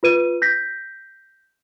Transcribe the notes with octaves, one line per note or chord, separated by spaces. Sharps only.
F4 B4 D#7
G6 A#6 B6